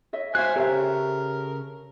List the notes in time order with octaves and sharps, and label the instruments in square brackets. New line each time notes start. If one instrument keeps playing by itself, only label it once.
[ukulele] C#5 D#5 E5
[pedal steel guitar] G#3 F5 F#6 [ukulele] F#4 E5 [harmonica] C5 G#5
[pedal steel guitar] C#3 A4 C#5 [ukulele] G4 C5 E5 [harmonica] A#4